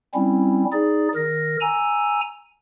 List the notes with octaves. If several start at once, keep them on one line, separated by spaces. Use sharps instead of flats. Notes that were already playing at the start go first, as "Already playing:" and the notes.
G3 C4 C#4 E4
D#4 G#4 D5
D#3 A#4 A#6
G#5 A#5 E6